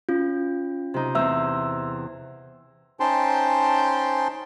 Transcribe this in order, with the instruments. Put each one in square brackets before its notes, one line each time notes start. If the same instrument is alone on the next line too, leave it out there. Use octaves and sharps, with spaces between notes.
[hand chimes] C#4 F4
[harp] C3 D#4
[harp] E2 C4 [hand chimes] E5 E6
[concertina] C#4 D#4 C5 G5 A5 C6